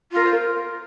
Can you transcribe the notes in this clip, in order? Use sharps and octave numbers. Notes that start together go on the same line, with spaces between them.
F4 A#4
C5
A#4